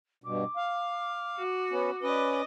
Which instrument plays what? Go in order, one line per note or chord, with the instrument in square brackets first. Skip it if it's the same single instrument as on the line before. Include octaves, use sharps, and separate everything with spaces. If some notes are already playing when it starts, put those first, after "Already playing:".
[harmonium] G2 B2 [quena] D6
[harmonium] F5
[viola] F#4
[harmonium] B3 C#4
[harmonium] C#4 B4 [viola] D5 D#5